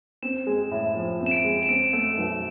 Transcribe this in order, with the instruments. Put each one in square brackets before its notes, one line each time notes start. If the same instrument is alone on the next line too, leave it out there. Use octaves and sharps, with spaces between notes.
[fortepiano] C4 [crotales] E7
[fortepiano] G#3
A2
F3
C4
[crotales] E7
D7
[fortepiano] G#3
[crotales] E7
[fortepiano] C4 [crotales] D7
[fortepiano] A3
B1